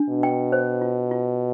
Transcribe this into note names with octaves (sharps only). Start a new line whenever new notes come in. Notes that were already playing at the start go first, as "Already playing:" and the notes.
Already playing: D4
B2
G5
C5
F4
F4